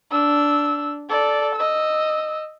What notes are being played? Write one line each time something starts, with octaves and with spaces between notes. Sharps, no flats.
D4 E6
A4 D5
D#5 E6